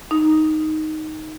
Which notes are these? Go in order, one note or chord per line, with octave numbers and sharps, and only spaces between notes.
D#4